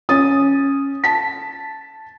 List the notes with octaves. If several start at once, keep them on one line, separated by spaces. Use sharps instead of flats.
C#4 D#6 A6
A5 B6